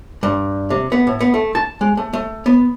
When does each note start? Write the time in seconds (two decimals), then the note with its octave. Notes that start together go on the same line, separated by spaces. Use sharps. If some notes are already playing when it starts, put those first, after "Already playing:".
0.23 G2
0.70 C3
0.92 B3
1.07 A2
1.21 B3
1.34 A3
1.55 A5
1.81 G#3
1.97 A3
2.13 A3
2.46 B3